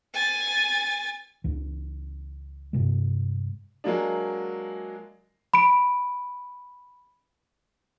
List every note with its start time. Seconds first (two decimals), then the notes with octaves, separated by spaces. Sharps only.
0.14 G#5 A6
1.44 C#2 E3
2.73 G2 C3 G#3
3.84 F#3 G#3 A#3 D4
5.54 B5 D7